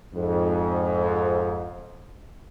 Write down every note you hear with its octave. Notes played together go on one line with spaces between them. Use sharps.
F2 G#2